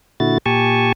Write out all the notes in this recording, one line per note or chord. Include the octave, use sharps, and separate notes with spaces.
A#2 D3 E4 F#4 A6
A#2 G4 G#5 A5 C#6